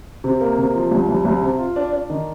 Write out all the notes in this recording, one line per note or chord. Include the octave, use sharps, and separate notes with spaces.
C3
A#3
C3
F3
C2
C2
C2
C3
F4
D4
D4
D#3